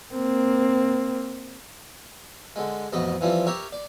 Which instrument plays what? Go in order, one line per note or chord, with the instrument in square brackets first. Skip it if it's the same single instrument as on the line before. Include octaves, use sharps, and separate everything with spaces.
[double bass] A#3 C4
[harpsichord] D3 G#3
A1 F2 B2 D#5 B5
E3 F3 G3 C4
G4 A#4 C#5 E5
D5